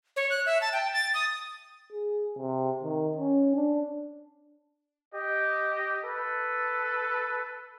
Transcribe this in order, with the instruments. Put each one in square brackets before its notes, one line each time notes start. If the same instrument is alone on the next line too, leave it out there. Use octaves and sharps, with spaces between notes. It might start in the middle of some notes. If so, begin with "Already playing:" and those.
[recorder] C#5
F#6
E5
A5
G5
A6
D#6
[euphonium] G#4
C3
D#3
C#4
D4
[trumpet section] G4 D#5
A4 B4